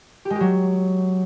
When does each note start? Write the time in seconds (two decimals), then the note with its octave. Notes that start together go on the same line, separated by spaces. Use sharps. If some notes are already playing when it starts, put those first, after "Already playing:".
0.25 G4
0.30 G#3
0.35 G4
0.40 F#3